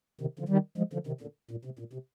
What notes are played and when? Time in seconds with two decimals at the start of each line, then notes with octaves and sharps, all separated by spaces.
0.21 C3 D#3
0.39 D3 F3
0.49 D#3 G3
0.78 F3 G#3
0.93 D3 F3
1.07 C3 D#3
1.21 A#2 D3
1.51 A#2
1.65 C3
1.79 A#2
1.93 C3